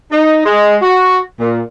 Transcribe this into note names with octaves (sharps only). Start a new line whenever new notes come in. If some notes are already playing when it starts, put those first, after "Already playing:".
D#4
G#3
F#4
A#2